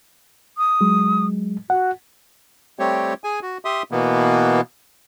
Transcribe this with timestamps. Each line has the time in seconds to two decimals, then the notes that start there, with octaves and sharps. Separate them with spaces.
0.58 D#6
0.81 F#3 G#3
1.70 F#4 F#5
2.79 G3 A3 C4 G4 C#5
3.24 G#4 G#5
3.42 F#4
3.65 G4 E5 C6 D#6
3.91 B2 E3 A#3 B3